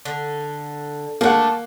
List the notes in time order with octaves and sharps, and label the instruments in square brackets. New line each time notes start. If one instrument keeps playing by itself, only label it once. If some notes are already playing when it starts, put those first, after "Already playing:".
[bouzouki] D3
[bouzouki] A3 D4 [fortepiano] A#3 F#5